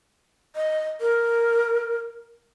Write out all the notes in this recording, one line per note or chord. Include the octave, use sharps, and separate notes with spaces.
D#5
A#4